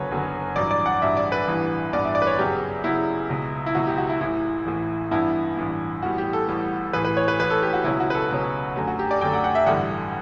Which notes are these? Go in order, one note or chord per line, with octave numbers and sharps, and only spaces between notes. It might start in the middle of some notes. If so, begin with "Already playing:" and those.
Already playing: F#1 F#2 D3 F#3 B3 B4 C#5
F#1 F#2 D3 F#3 B3
A1 G2 F#3 D5
D5
F#5
A1 G2 F#3 E5
D5
B4
A1 G2 E3 B3
A1 G2 E3 B3 D5
E5
D5
B4
C#5
F#2 C#3 F#3 B3 G4
F#2 C#3 F#3 B3 E4
C#2 B2 F#3
E4
C#2 B2 F#3 F#4
G4
F#4
E4
A1 A2 E3 E4
A1 A2 E3
A1 G2 E3 B3 E4
A1 G2 E3 B3
A1 A2 G3 B3 F#4
G4
A4
A1 A2 G3 B3
A1 A2 E3 B4
B4
C#5
B4
A1 A2 E3 B4
A4
G4
F#4
C#2 B2 F#3 C#4 E4
F#4
B4
A4
C#2 B2 F#3 C#4
F#2 D3 F#3 A3
F#4
G4
D5
F#2 D3 F#3 A3 G5
F#5
F#5
E5
A1 G2 D3 G3 F#5